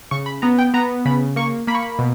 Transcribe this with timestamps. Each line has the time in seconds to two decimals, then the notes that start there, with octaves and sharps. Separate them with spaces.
0.11 C#3 C#6
0.26 B5
0.42 B3 A#5
0.59 G5
0.74 B3 A#5
1.05 C#3 B5
1.36 A#3 C#6
1.67 A#3 B5
1.75 C#6
1.83 B5
1.99 B2